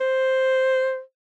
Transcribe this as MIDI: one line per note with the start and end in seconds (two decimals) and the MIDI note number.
0.01 1.00 72